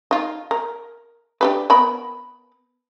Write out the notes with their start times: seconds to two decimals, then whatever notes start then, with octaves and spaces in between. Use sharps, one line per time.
0.11 D#4 F4
0.51 A#4
1.41 D4 G4 B4
1.70 B3 A#4 B5